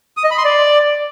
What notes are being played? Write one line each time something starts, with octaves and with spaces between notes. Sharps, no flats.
D#6
D#5
B5
C6
D5